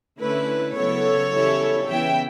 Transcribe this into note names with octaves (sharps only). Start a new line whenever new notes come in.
D3 A3 C#4 E4 B4
C#3 F#3 B3 E4 A4 C#5
E2 C#3 G3 C#4 E4
C#3 E3 B3 E4 E5 G5